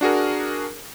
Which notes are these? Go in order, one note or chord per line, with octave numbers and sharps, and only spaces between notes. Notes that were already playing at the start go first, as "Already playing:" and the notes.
D4 F#4 G#4 A#4